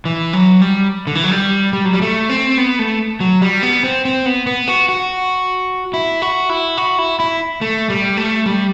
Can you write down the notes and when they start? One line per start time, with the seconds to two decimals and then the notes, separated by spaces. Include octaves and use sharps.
0.05 E3
0.33 F#3
0.62 G3
1.07 D3
1.15 E3
1.23 F#3
1.31 G3
1.73 G3
1.85 F#3
1.93 G3
2.01 A3
2.29 C4
2.58 B3
2.79 A3
3.20 F#3
3.42 G3
3.63 B3
3.84 C4
4.05 C4
4.26 B3
4.47 B3
4.68 F#4
4.89 F#4
5.94 E4
6.22 F#4
6.50 E4
6.77 F#4
6.99 E4
7.20 E4
7.61 A3
7.90 G3
8.17 A3
8.46 G3